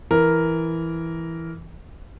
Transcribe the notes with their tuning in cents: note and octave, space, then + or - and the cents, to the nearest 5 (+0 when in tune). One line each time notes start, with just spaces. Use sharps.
E3 +0 A#4 +0